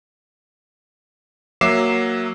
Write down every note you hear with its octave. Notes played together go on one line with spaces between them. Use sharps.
F#3 A#3 E5 D6 C7 E7